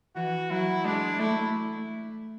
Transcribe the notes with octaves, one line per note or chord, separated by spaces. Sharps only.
E3 F#4
F#3 E4
G#3 D4
A3 E4